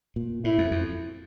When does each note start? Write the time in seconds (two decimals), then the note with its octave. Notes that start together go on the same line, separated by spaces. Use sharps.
0.16 A#2
0.44 A2 E4
0.58 F2
0.71 F2